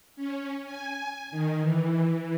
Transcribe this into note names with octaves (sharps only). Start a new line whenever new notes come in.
C#4
G#5
D#3
E3